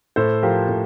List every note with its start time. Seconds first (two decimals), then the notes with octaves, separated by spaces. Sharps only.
0.16 A2 A4 C5
0.42 F3 G4 A#4
0.69 A2